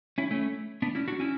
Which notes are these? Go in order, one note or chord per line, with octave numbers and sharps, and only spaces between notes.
C#4 E4
A3 C#4
B3 D4
C#4 E4
D4 F#4
C#4 E4